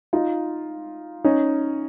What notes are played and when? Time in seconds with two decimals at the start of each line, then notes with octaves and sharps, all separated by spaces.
0.13 D#4 F4
1.24 C#4 D#4